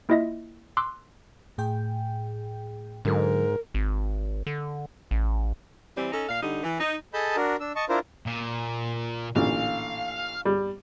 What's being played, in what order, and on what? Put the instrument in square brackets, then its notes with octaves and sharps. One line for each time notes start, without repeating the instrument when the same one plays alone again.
[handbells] A#3 E4 F4 D#5 E5 A#6
C6 D6 E6 F#6
[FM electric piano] A2 G#4 G5
[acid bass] G#2 [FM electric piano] D3 F#3 A4 [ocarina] A#4
[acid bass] G#1
D3
A1
[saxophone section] E3 G3 C4
C#4 D#4 A4
A#2 F5
D3 G3 D#4
E3
D#4
[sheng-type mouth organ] G#4 A4 D#5 A5 B5 G6
D4 F#4 A#4
D4 E6
D#5 A5 C#6
D4 E4 F4 A#4 C5
[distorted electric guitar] A#2
[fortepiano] A1 A#2 D3 [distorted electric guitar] F5
[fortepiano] G3